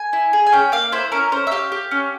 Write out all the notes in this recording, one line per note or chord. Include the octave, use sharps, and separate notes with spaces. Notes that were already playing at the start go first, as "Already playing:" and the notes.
Already playing: G#5
E4
G#4
G#5
C#4 G5
A#3 F5
E4 C5
C#4 A#4
C#4 C5
E5
G4 F5
G4
C#4